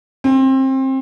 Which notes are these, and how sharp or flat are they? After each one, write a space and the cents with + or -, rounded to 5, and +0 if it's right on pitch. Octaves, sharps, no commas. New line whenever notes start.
C4 +25